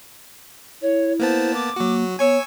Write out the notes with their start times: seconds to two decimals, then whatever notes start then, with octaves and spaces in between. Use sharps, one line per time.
0.82 E4 C#5
1.19 A#3 B3 C5 A5
1.54 D6
1.76 F#3 A#3 F#4
2.19 B3 C#5 G#5 C#6 E6